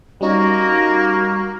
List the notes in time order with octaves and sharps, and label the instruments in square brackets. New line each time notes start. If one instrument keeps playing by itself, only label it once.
[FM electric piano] G3 C#4 D#4 [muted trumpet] A#3 [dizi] F#4